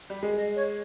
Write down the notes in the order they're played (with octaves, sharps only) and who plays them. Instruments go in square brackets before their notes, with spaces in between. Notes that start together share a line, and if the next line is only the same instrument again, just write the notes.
[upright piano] G3
G#3
[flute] D#5
C#5